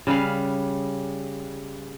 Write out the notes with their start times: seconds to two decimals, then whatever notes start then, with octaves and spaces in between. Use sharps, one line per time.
0.07 C#3 G3 B4 F5